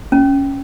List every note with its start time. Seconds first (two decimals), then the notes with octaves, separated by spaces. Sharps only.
0.12 C#4